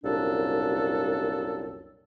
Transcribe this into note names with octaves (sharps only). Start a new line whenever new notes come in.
C2 F#2 A#2 D4 A4